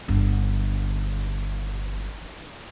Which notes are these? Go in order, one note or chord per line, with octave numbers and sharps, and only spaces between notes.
G1 D3